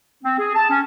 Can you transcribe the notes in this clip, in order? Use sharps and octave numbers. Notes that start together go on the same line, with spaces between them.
C4
G#4
A5
C#4